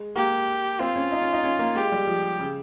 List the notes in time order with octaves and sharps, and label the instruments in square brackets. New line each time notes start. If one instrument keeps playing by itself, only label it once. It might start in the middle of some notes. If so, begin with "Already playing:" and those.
Already playing: [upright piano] G#3
[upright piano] A#3 [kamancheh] G4
[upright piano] C4 [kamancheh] F4
[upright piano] C#4
D#4
C#4
D#4
C#4
A#3
[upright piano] G#3 [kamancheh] G4
[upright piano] G3
F3
C#3